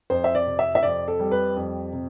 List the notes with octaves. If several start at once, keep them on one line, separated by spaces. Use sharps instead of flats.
F2 C5
E5
D5
C3
E5
E5
F2 D5
A4
G3
B4
F2
C3